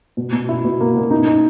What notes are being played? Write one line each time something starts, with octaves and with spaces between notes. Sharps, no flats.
B2
B2
E4
B2
A#3
B2
D#4
D#4